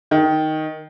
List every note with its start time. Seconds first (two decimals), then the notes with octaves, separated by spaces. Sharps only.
0.11 D#3